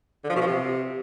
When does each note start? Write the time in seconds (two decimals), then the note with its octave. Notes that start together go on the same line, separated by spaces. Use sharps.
0.24 D3
0.30 F3
0.35 B2
0.41 F3
0.47 C3